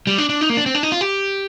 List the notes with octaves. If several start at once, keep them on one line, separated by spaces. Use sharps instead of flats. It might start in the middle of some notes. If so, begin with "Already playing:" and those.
G3
D4
D4
D#4
A#3
D4
C4
D4
D#4
F4
G4